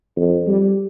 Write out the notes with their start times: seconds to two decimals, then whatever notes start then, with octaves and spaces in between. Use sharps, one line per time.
0.16 F2
0.48 G3